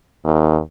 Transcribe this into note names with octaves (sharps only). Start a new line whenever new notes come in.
D#2